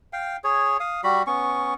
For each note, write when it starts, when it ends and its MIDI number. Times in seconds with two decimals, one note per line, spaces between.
0.13 0.37 77
0.13 0.37 79
0.44 0.77 68
0.44 0.77 73
0.80 1.01 77
0.80 1.01 87
1.04 1.23 55
1.04 1.23 66
1.04 1.23 83
1.27 1.74 59
1.27 1.74 61
1.27 1.74 85